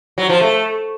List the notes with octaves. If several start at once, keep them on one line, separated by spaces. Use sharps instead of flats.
F#3
F3
A3